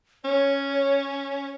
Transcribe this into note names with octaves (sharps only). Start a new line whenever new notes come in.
C#4 C#5